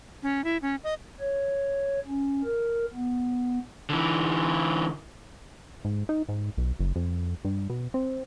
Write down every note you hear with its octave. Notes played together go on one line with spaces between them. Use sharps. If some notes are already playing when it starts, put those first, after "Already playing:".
C#4
E4
C#4
D#5
C#5
C#4
A#4
B3
D3 E3
G#2
D#4
G#2
B1
F#1
F2
G2
B2
C4